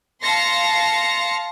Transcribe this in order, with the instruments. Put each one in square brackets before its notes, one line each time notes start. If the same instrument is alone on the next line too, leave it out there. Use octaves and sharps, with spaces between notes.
[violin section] F5 A5 C6 A#6 C#7